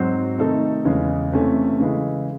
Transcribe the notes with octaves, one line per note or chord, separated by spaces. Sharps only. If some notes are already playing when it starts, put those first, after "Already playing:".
Already playing: G#2 F#3 C4 F#4 C5
C3 D#3 A3 D#4 A4
E2 C#3 G#3 C#4
C3 E3 A3 C#4
C#3 E3 G#3